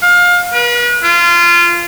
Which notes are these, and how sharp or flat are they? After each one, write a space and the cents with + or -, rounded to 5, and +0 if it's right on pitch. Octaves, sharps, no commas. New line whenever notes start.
F5 +25
B4 -40
F4 -20